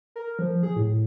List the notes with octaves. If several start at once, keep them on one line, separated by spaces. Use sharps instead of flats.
A#4
F3
G#4
A2